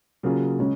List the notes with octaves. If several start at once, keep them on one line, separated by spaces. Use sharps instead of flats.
C#3 F#3 A#3 F4 G#4
C#3 G#3 C#4